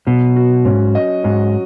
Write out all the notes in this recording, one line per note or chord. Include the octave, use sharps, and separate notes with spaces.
B2 F#3
F#4
G#2 C#4
D#5
G#2 F#3